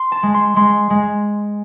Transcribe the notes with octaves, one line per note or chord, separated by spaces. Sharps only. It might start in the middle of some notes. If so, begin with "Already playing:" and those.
Already playing: C6
A5
G#3
C6
G#3 C6
G#3